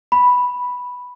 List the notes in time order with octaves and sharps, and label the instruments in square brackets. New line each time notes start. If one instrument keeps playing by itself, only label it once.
[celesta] B5